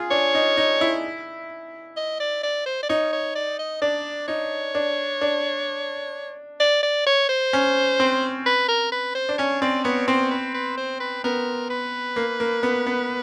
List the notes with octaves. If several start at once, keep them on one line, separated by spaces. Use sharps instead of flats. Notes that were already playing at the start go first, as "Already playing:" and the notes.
Already playing: F4 G#4
D4 C#5
D#4
D#4
E4
D#5
D5
D5
C5
D5
D#4 C#5
C#5
D5
D#5
D4 D5
D#4 C#5
D4
D4
D5
D5
C#5
C5
C#4
C4
B4
A#4
B4
C5
D4
C#4 C#5
C4 D5
B3 C#5
C4 C5
B4
B4
C5
B4
B3 A#4
B4
A#3
A#3
B3
B3